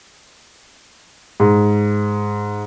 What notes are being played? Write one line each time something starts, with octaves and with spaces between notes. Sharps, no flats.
G#2